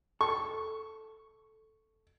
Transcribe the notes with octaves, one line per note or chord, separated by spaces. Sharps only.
A4 C#6